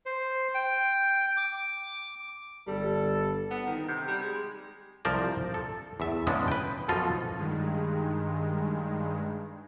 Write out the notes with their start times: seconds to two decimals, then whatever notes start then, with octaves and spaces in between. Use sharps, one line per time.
0.06 C5
0.54 G5
1.37 D6
2.67 G1 G3 A4
3.50 B3
3.66 D#3
3.88 C3
4.08 G3
4.22 G#3
5.05 C2 F3 A#4 C5 D5
5.54 A4
6.00 E2 E5
6.27 C#3 E3 G#3 B3 C#4 D4
6.48 B4 G5
6.88 F#2 B2 F3 F4 A4 D#5
7.36 G2 D#3 G#3